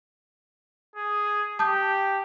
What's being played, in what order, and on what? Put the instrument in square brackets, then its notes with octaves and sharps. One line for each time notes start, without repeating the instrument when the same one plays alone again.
[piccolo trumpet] G#4
[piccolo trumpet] G4 [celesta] A5 D#6 G6